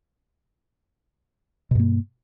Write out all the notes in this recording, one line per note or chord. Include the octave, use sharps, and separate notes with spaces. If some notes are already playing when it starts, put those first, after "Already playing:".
G2 B2 A#3